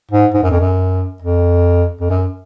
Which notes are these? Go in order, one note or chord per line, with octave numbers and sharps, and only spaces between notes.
G#2
G#2
F#2
F2
F#2
F2
F2
F#2